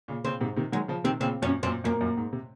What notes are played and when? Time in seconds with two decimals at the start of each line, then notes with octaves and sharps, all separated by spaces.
0.08 A#2 C#3
0.25 A#2 C#3 C4
0.40 G#2 C3
0.56 C3 D#3
0.72 D#3 F#3 G#3
0.88 C#3 F3
1.04 C3 D#3 C4
1.20 A#2 C#3 C4
1.42 F#2 A#2 C#4
1.63 F#2 A#2 C4
1.84 F#2 A#2 A#3
2.01 F#2 A#2
2.17 G#2
2.33 C3